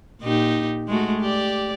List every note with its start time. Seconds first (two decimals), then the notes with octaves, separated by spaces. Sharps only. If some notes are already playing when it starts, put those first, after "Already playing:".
0.21 A#2 D#4 G4
0.88 G#3 A3 F#4
1.20 G4 D5